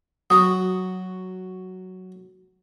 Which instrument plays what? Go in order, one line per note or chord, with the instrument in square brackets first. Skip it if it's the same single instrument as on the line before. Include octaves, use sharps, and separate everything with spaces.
[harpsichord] F#3 F#4 [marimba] D#6